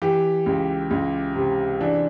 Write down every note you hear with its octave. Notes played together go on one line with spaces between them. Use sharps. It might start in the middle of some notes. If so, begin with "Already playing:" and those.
E3 G4
C#2
C#2
C3
E3 D4